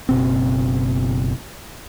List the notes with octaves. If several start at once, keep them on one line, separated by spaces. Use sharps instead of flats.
F#1 B2 C4